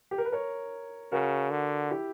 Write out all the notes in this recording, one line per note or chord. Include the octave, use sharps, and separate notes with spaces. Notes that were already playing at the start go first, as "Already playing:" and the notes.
G4
A#4
B4
A#4 C#5
C#3 F#4 A#4
D3
E4 G4